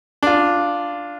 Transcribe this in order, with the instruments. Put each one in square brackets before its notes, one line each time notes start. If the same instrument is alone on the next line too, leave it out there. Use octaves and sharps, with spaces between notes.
[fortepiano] D4 F4